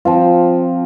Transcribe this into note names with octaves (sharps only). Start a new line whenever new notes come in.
F3 C4 F4